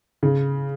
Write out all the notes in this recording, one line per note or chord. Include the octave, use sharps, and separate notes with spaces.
C#3